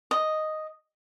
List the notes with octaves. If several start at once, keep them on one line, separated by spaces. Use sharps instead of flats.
D#5